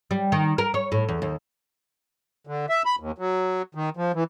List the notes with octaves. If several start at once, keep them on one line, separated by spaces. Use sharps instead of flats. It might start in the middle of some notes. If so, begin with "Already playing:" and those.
G3
D#3
A#4
C#5
A2
E2
D#2
D3
E5
B5
D#2
F#3
D#3
F3
E3